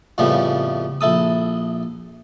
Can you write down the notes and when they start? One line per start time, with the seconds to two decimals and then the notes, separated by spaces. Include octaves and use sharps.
0.18 F2 A2 C#3 F3 G3 B3
1.01 A#1 E4 A4 D#6